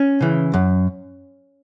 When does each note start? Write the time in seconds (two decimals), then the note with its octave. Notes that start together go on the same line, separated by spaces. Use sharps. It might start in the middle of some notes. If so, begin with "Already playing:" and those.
Already playing: C#4
0.21 C#3 E3
0.54 F#2